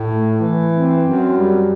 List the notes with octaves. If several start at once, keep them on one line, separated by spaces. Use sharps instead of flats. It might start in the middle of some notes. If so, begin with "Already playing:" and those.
Already playing: A2
A3
E3
C4
F#2
G3